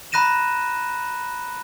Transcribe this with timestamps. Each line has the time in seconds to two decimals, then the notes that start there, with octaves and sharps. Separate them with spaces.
0.12 A#5 B5 F#6 A#6 D#7 E7